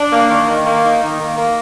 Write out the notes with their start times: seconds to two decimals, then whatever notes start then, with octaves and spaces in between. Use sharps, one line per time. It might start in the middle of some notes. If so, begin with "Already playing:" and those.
Already playing: D4
0.12 A#3
0.30 D#3
0.48 D#3
0.66 A#3
0.84 D#4
1.02 D#3
1.20 A#3
1.37 A#3